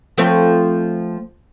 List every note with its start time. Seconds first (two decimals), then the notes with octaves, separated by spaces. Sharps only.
0.18 F3 A3 C4